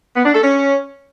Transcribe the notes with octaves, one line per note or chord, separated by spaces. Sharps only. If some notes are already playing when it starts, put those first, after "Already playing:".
B3
D4
A4
C#4